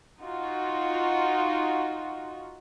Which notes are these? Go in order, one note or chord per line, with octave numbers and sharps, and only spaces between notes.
D#4 F4 F#4